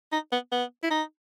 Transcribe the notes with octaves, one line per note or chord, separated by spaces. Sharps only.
D#4
B3
B3
E4
D#4